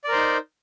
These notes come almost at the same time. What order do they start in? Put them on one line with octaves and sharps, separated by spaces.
D5 A#4 C5 D#4